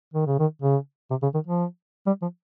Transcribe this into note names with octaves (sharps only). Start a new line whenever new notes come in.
D#3
C#3
D#3
C#3
C3
C#3
D#3
F3
G3
F3